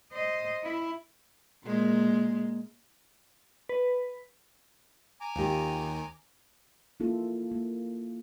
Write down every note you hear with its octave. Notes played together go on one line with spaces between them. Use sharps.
C5 D#5
E4
A#2 G#3 A#3
B4
G#5 A#5 D6
D#2 D#3 F4 G4
A#3 E4 F4 A4
A#3